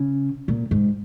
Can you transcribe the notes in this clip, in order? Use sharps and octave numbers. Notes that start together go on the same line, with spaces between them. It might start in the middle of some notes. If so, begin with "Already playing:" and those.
Already playing: C#3
A#2
G#2